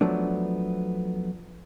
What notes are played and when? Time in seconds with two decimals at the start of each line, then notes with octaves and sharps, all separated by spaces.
0.01 F3 F#3 A3 B3 D4